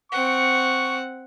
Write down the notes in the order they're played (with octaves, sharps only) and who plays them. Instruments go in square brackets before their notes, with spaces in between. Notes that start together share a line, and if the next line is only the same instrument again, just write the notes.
[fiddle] C4 F#5 [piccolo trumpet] C#6